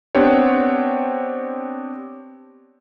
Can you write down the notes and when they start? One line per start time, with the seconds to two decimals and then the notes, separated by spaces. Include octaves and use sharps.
0.15 B3 C4 D4 G4 C#5